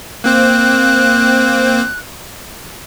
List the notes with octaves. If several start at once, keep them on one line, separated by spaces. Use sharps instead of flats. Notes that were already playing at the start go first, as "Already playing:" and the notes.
A#3 C4 C5 F#6